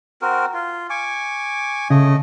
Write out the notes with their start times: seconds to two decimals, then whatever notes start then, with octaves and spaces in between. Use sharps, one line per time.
0.22 C4 F#4 A#4
0.54 F4
0.90 G#5 C#6 D6
1.90 C#3 A3 D#5